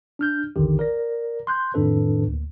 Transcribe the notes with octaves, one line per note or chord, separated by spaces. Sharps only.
D4 F6 G6
A#1 E2 D3 D#3 G4
A#4 D5 A#6
C6 F#6 G6
F2 A2 D#3 D4 A4 B4
D2 A#3